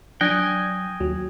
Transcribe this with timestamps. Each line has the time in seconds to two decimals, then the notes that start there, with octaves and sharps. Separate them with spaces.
0.21 F#3 D4 G5 G#5 D#6 F#6 G#6 A#6
1.00 D#2 F#3